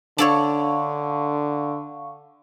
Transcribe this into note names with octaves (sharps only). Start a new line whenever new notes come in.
D3 D4 A4 C#5 F5 C#6